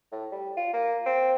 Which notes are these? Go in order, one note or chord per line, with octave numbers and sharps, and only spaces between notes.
A2
G3
F4
A#3
C4